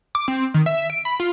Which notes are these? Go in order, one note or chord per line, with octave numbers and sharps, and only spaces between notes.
D6
C4
D#3
E5
D7
B5
F4